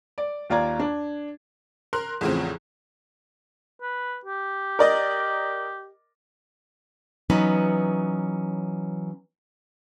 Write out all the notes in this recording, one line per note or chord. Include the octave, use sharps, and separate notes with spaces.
D5
D#2 F4 D5 A#5 G#6
D4
A#4 C6 F#6
E2 A2 C#3 F3 C4
B4
G4
A#4 D5 D#5
E3 F#3 B3 C#4 D#4 B4